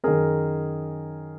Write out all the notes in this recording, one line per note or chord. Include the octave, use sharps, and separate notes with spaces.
F#2 D#3 G#4 A#4